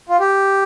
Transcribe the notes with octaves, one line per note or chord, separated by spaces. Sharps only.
F4
G4